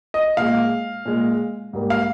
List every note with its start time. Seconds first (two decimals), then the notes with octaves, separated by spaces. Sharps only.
0.14 D#5
0.37 A#2 G#3 F5
1.05 A#2 G#3
1.73 G#2 G3 A#3
1.90 F5